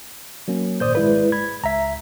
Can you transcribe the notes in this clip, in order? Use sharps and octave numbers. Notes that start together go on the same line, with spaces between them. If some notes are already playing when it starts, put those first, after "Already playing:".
F#3 A#3 C#4
G#1 A#2 C5 D5 D#6 G6
G#3 E4 B4
B5 G#6
C#2 E5 A#5 B6